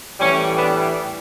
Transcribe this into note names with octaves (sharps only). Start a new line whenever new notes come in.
A2 E3 G3 C#4
B3 D4